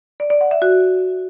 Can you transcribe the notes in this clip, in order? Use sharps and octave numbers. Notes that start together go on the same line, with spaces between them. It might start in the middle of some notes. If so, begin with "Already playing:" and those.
D5
D5
F#5
E5
F#4